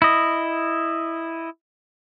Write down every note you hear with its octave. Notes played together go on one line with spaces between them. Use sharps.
E4 D#5